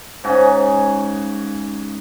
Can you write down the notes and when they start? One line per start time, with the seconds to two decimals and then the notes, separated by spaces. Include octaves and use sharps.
0.24 G#2 C#3 F#4 G#4